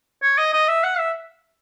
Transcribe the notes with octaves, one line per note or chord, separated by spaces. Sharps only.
C#5
D#5
D#5
E5
F#5
E5